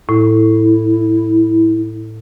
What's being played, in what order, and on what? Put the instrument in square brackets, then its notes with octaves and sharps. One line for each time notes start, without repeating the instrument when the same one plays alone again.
[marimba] A2 [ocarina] E4